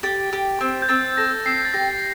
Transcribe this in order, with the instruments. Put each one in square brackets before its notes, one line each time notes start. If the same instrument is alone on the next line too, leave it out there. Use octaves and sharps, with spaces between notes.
[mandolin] G4 [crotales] A6
[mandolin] G4
C4
[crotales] G6
[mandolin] C4 [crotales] A6
[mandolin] A4 [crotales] A#6
[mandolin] C4 [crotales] C7
[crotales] A6
[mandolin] G4 [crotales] A#6